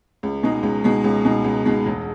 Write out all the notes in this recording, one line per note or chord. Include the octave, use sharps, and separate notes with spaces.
C#2
B2 G#3 D#4
C#2
B2 G#3 D#4
C#2
B2 G#3 D#4
C#2
B2 G#3 D#4
E1